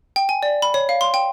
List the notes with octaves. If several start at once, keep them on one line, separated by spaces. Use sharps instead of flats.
G5
G#5
D5
B5
C#5
F5
C6
G5